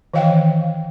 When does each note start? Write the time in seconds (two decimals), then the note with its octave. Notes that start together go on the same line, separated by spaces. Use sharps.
0.14 D#3 E3 D#5 F5 G5